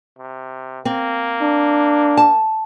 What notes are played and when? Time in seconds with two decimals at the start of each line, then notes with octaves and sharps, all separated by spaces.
0.19 C3
0.85 A#3 C4
1.41 D4
2.17 A5